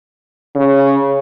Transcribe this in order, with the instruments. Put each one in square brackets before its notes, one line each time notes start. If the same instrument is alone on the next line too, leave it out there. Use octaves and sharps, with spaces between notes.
[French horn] C#3